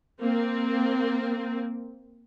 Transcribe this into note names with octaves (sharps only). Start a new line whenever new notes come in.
A#3 C4